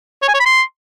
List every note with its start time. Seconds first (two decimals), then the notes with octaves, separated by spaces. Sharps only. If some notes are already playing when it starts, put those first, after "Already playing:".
0.22 C#5
0.28 G#5
0.34 C#5
0.40 B5
0.45 C6